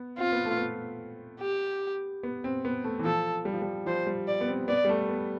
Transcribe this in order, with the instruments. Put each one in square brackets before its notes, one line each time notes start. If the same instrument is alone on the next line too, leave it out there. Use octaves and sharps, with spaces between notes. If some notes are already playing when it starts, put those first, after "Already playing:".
Already playing: [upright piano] B3
[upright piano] C4 [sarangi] F4
[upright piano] B3
A3
B3
[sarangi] G4
[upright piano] B3
C4
B3
A3
E3
[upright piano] F3 [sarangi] A4
[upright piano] G3
F3
G3
[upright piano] F3 [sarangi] C5
[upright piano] G3
[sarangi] D5
[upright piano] B3
C4
[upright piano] B3 [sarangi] D5
[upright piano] G3
A3
B3